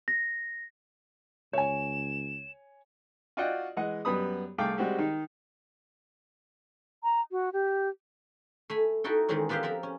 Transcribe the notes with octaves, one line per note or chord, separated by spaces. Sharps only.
A#6
C#2 C#5 G#5 E7
F4 F#4 D5 D#5 F#5 G5
E3 G#3 D#5 F#5
F#2 G3 B3 B5 D#6
C2 A3 G#4 F5 G5 D6
G3 G#3 C4 F#4 G4
D#3 D#4
A#5
F#4
G4
A3 G#5 B5
D#4 E4 F#4 A4 G5
D#3 E3 G#3 C4 C#4
B3 F4 G4 B4 C5 F5
F3 C4 A#4 E5
C#4